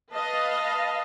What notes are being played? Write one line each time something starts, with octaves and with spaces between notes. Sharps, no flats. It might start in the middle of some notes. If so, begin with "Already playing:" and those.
B4 D#5 F5 A5